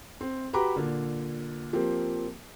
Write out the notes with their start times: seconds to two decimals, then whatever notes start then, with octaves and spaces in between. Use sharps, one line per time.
0.21 C4
0.53 F#4 G4 B4 A#5 B5 D6
0.76 A#2 D3
1.73 F3 A#3 C4 G4